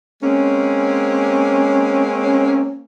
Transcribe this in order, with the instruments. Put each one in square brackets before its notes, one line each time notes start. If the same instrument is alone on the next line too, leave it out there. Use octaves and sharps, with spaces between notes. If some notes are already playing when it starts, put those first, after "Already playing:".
[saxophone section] G#3 A#3 C4 C#4